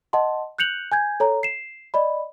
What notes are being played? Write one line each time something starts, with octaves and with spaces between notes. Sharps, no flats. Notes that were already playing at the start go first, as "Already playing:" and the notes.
D#5 F#5 A5 C6
F#6 G6 C#7 F7 F#7
G#5 G6 G#6
A4 C#5 A#5
C7 E7
D5 D#5 B5